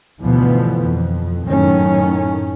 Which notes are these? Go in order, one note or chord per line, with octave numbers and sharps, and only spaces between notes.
D2 G2 B2 E3 F3 B3
F2
F#2 A2 D#3 C#4